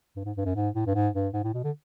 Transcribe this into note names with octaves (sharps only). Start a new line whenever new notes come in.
G2
G#2
G2
F#2
G#2
A2
G2
G#2
G2
G#2
A2
B2
D3